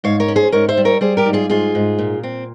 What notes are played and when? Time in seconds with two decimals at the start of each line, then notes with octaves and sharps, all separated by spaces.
0.04 G#2 C#5 F5
0.20 A#4 C#5
0.28 C#4
0.36 G#4 C5
0.52 G#2 A#4 C#5
0.69 C5 E5
0.77 G3
0.85 A#4 C#5
1.01 G3 G#4 C5
1.17 G4 A#4
1.26 G#2
1.33 F4 G#4
1.50 G#2 F4 G#4
1.75 G#2
1.99 A#2
2.23 C4